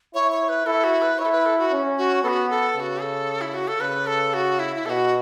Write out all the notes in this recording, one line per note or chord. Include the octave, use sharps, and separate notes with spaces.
E4 C#5
C#5
B4
E4 A4
F#4
B4
E4 C#5
A4
B4
A4
F#4
C#4
F#4
B3 F#4 A4
A4
C#3 F#4 A4
A4
E4
F#4
A4
C#3 B4
A4
F#4
E4
E4
B2 F#4 A4